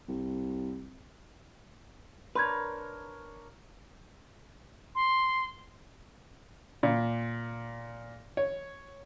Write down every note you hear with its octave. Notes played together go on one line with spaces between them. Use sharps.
C2
D4 A#4 B4 C#5 C6 G6 G#6
C6
A#2
C#5